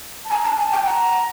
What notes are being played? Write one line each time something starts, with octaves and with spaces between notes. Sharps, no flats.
A5
G#5 A#5
A5
G#5 A5
G5
F#5 A#5